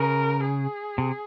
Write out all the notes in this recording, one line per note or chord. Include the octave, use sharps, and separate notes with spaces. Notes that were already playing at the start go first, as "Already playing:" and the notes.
Already playing: C#3 A#4
G#4
C3